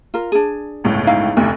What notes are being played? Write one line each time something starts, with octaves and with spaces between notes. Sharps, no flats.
F4 A#4
D4 G#4
G1 C#2 A2
D#4 E4 F5
F1 D2